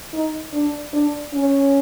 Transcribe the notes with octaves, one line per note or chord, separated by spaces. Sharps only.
D#4
D4
D4
C#4